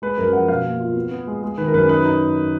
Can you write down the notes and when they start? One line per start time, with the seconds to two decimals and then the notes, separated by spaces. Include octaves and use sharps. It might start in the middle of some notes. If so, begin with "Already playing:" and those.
0.02 G#3 B4
0.18 F#2 A#4
0.33 F3 F#5
0.48 B2 F5
0.64 A#3
0.80 F4
0.96 B3
1.11 B3
1.27 G#3
1.43 G#3
1.58 D#3 B4
1.67 A#4
1.74 F#2 B4
1.89 D#4 B4
2.05 D#4